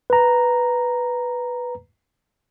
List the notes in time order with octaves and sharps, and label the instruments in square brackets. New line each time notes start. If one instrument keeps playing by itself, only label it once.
[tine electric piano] B4 A#5